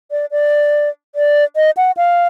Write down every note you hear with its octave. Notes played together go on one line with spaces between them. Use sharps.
D5
D5
D5
D#5
F#5
F5